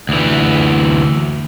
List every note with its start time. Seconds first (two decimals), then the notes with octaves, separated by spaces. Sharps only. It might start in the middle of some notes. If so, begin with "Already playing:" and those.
0.09 D2 E3